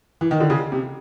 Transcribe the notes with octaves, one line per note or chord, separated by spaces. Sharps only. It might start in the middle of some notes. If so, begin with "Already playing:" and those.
E3
D#3
D3
C#3
C3